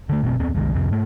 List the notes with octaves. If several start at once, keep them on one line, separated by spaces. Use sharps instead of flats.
D3 A3
F#1 B2 A3 C4
D#2 B3 C4
F#1 C2 D#3 G#3
C2 F2 C3 C4
G#2 A3